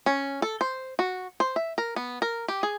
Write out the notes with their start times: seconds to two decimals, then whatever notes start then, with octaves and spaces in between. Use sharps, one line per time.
0.06 C#4
0.42 A4
0.61 C5
0.99 F#4
1.40 C5
1.56 E5
1.78 A#4
1.96 B3
2.22 A#4
2.48 G4
2.63 G#4